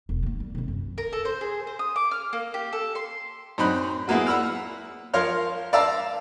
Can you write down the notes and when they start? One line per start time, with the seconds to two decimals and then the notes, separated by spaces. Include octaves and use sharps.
0.09 E1
0.23 D#3 A#3
0.40 G3
0.55 C3 D#3
0.68 F#2
0.98 A#4
1.13 A4
1.25 C5
1.41 G#4
1.67 C5
1.79 D#6
1.96 D6
2.11 F6
2.33 A#3
2.54 G4
2.73 A4
2.95 C6
3.58 F#2 C4 D#4 B5 F#6
4.08 F#3 A#3 B3 E4 G#4
4.27 F#5 B5 E6 F6
5.14 F3 A#4 C#5 F5 C6 F6
5.73 D5 E5 F5 A5 A#5 E6